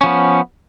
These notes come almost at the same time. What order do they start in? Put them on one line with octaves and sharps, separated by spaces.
C#4 F3 B3